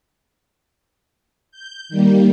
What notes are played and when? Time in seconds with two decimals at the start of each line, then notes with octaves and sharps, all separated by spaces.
1.51 G6
1.89 D#3 G3 A#3